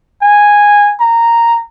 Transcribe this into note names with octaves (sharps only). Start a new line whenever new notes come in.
G#5
A#5